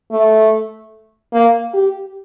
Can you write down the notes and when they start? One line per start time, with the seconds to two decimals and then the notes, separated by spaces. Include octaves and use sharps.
0.11 A3
1.33 A#3
1.74 G4